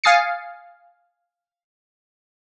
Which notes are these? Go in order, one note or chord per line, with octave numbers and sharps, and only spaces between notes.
F5 G#5 D#6 A6 C7 C#7